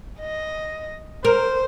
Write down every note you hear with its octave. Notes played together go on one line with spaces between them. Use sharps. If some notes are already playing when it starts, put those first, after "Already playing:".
D#5
A#4 C5